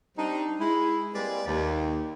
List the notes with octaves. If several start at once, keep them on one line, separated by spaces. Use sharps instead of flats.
G3 C4 D4 D#4
G#3 E4
G3 G#3 A#3 C4 B4 D5
D#2